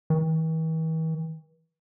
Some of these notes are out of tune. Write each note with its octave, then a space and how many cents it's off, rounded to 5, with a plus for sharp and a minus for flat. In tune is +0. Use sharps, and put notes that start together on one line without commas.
E3 -45